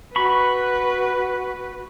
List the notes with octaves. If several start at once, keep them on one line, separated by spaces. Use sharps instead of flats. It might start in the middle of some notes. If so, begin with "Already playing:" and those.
F#4 B4 B5 C#6